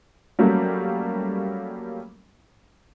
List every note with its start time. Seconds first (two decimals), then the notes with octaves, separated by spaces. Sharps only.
0.39 F#3 G3 A3 A#3 C#4